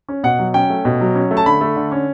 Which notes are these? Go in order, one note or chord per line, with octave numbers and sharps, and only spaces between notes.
C#4
B2 F#5
F#3
C#4 G5
A3
B2
F#3
C#4
A3
A5
D3 B5
A3
D3
C#4